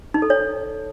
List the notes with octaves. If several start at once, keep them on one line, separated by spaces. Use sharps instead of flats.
D#4
A4
C#5